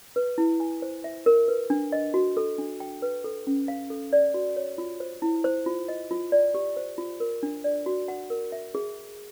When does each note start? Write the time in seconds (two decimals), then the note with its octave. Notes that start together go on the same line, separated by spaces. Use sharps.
0.16 B4
0.38 E4
0.60 G#5
0.82 C5
1.04 E5
1.26 A#4
1.48 B4
1.70 D4
1.92 D#5
2.14 F#4
2.37 A4
2.58 D4
2.80 G5
3.02 B4
3.24 A4
3.47 C#4
3.68 F5
3.90 A4
4.13 D5
4.34 F#4
4.56 C#5
4.78 F4
5.00 C5
5.22 E4
5.44 C5
5.66 F4
5.88 D#5
6.11 F4
6.32 D5
6.54 G4
6.77 C5
6.98 F4
7.20 A#4
7.43 D4
7.64 D5
7.86 F#4
8.08 F#5
8.30 A#4
8.52 E5
8.75 G#4